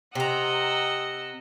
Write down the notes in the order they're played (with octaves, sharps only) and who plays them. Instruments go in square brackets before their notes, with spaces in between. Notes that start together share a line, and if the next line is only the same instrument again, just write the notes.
[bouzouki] C3 A#5 [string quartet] D#5 F#5 E6